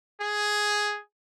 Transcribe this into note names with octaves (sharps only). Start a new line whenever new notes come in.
G#4